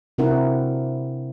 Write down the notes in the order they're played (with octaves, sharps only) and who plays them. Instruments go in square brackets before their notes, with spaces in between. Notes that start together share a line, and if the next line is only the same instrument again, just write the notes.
[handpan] C3 C4 D4 E4 A#4 F#5